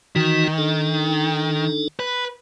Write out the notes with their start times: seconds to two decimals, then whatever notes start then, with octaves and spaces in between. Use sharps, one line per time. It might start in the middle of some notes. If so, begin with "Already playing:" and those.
0.16 D#3 E3 D#4 F#4
0.58 D4 D#4 A4
2.00 B4